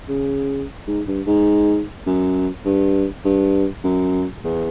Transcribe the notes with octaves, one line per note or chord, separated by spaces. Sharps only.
C#3
G#2
G2
G#2
F#2
G2
G2
F#2
E2